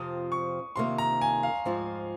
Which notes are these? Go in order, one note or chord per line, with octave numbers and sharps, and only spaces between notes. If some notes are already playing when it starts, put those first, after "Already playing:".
Already playing: F2 C3 F3 C4 F4 D#6
C#6
F2 C3 D#3 A#3 C6
A#5
G#5
F5
G#2 F3 C4 F4